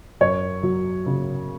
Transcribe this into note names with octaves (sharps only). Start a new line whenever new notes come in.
F#2 C#5
F#3
C#3